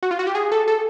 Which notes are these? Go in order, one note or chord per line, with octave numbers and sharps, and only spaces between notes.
F#4
F4
F#4
G4
G#4
A4
A4